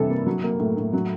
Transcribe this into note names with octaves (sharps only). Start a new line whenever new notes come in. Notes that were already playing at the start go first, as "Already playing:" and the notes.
Already playing: C3 E3 G3 A4
A#3
F#3
A#3
A2
A2
F#3